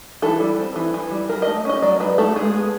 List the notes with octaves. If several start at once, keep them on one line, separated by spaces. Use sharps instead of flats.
E3 A4
G3
C4
E3
E3
G3
F#3 A#4
A3 D#5
C#4 D#5
F#3 D5
F#3 B4
A3 A4
G#3 G#4
B3